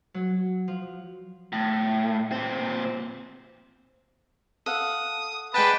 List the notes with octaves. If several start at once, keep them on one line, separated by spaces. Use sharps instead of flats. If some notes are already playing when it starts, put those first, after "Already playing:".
F#3
F3
A2
A#2 C4
A4 F5 F#5 D#6
G#3 B4 D5 F#5 G5 A5